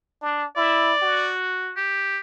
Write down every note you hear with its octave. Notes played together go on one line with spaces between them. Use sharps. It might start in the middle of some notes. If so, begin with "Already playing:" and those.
D4
E4 D5
F#4
G4